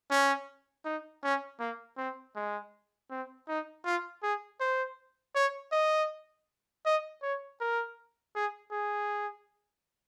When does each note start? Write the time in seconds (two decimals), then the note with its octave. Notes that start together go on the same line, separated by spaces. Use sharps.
0.10 C#4
0.85 D#4
1.23 C#4
1.60 A#3
1.97 C4
2.36 G#3
3.10 C4
3.48 D#4
3.85 F4
4.23 G#4
4.60 C5
5.35 C#5
5.72 D#5
6.85 D#5
7.22 C#5
7.60 A#4
8.35 G#4
8.72 G#4